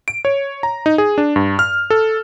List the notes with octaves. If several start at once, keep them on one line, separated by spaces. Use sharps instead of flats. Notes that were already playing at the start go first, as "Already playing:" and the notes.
D7
C#5
A#5
D#4
G#4
D4
G2
F6
A4